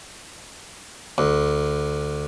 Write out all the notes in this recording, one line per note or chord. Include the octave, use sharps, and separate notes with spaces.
D2